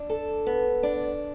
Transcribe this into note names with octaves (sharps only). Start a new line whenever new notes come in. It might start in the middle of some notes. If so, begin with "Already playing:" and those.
Already playing: D4
A4
B3
D4